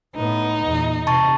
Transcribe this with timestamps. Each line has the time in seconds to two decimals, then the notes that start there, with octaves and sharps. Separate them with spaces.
0.15 A2 B3 D#4
0.66 E2 A#2
1.07 C3 A5 C#6 A6